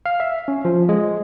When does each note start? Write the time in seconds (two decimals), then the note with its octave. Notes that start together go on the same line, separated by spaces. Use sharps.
0.06 F5
0.20 E5
0.48 C#4
0.65 F3
0.89 G#3